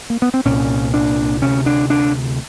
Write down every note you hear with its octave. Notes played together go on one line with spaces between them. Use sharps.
A#3
B3
C4
C2 A#2 C#4
D4
D2 C3 C#4
D4
D4